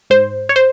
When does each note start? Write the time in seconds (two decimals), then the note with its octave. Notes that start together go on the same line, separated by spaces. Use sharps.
0.10 G#2 C5
0.49 C#5
0.56 C5